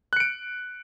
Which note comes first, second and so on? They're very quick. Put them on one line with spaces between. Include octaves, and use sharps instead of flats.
F#6 C#7 D7